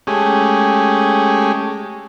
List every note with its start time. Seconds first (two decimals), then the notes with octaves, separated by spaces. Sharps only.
0.07 G#3 A3 C#4 G4 G#4